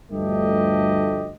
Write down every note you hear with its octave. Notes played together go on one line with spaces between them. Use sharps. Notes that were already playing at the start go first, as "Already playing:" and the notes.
D2 G2 F3 A3 G4 D#5